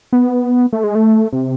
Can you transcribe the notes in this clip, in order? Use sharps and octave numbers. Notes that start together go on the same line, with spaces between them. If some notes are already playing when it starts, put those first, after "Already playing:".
B3
A3
G#3
A3
C3